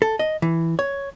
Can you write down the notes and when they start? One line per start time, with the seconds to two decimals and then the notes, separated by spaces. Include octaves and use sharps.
0.02 A4
0.19 D#5
0.42 E3
0.79 C#5